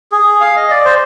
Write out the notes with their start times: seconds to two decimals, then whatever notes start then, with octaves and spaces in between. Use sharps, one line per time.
0.12 G#4
0.41 F5
0.56 D#5
0.71 D5
0.85 C5